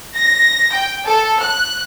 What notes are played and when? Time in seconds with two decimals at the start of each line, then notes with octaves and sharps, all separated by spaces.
0.16 A#6
0.73 G5
1.06 A4
1.40 F#6